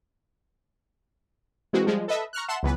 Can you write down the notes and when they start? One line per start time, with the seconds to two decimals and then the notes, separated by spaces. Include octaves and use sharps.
1.73 E3 G#3 A#3 C4 F#4
1.86 F3 G3 G#3
2.08 A4 B4 D#5 E5
2.33 A#5 C#6 F6 F#6
2.48 E5 F#5 A5 C6 E7
2.63 C#2 E3 F#3 B3 B4